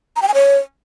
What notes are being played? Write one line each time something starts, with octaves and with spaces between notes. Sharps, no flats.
A#5
G5
G#5
C#5